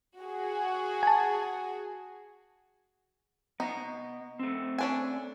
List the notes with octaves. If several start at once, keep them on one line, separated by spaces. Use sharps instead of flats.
F#4 G#4
G#5 A5
B3 D#4 D#5
A3 C4
C#4 D4 G#5